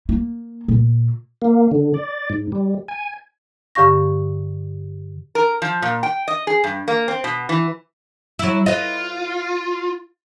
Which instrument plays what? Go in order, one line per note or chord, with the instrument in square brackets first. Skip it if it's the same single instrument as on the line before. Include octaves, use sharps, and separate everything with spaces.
[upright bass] A#3
A#2
[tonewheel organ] A#3
D3
D5
G#2
G3
G#5
[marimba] G2 D3 G4 F5 C#6 A#6
[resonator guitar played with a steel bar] A#4
F3
A#2
G5
D#5
G#4
G2
A#3
C4
B2
E3
[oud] F#3 E4
[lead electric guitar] F4 [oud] B4 D#5